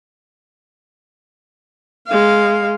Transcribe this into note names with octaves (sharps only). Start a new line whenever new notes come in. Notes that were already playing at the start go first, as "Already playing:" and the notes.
G#3 F5